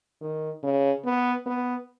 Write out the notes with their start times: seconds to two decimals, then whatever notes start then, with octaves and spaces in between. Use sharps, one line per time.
0.21 D#3
0.63 C#3
1.05 B3
1.46 B3